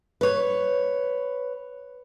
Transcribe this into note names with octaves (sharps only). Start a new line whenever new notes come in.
B4 C#5